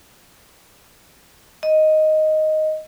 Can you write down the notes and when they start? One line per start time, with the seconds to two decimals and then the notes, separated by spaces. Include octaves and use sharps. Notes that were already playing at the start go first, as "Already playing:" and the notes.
1.63 D#5